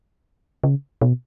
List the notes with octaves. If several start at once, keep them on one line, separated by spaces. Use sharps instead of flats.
C#3
B2